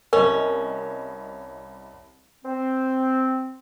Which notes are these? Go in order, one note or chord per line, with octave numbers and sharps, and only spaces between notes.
C2 C#4 A#4 D#5
C4